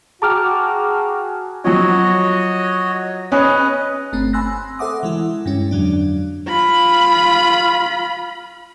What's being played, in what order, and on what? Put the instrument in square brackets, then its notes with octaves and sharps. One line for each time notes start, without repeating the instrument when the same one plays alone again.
[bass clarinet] F#4 [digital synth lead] G#4 [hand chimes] G5 A#5 [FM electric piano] A5 D6 F6
[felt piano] F3 F#3 [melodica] F#4 C#5 D#5
[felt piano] C#4 [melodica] G#4 B4 D#5
[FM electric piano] G1 A3 C4
G#5 B5 C6 E6 F#6 A#6
A4 C5 E5 F#5 D6 D#6
E3 G#3 E4
G2 G#3 C#4
F2 D3 F#3 D4
[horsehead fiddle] F4 B5